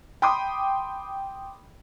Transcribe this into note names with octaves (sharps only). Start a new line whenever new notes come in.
G5 B5 C6 D6 D#6